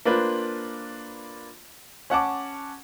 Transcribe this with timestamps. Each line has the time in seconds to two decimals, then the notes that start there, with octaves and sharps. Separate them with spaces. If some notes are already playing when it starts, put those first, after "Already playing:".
0.05 A#3 D4 F4 B4 C5
2.10 C#4 F#5 A5 D6